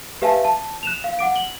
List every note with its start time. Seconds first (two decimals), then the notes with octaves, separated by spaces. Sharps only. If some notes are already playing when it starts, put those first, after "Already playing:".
0.22 G4 B4 E5 F5 G#5 A5
0.45 A5
0.83 F#6 E7 F7
1.04 F5
1.19 F#5 D6 D7
1.36 F#7 G7